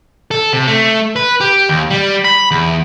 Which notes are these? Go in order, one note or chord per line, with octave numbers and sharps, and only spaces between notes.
A4
C3
A3
B4
G4
D#2
G3
B5
E2